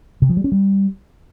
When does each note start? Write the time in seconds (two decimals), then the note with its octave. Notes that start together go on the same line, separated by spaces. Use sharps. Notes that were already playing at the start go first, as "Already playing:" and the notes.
0.22 C3
0.29 F3
0.37 G3
0.44 C#4
0.52 G3